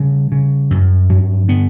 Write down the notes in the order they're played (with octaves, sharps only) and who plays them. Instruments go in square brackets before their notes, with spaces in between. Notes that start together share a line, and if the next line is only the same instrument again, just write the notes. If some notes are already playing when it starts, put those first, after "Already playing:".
Already playing: [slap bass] C#3 G3
C#3
F#2
G2 F#3
D3 B3